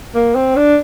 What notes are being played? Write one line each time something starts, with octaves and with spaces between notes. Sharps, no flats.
A#3
C4
D4